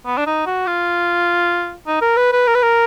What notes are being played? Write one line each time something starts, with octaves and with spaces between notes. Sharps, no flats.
B3
D4
D#4
F#4
F4
D#4
A#4
B4
B4
A#4
B4
A#4